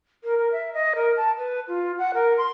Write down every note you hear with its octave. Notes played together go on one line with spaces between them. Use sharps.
A#4
A#4
E5
D#5
A#4
A5
B4
F4
F#5
A#4
C6